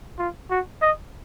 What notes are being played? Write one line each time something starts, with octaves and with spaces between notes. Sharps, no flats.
F4
F#4
D#5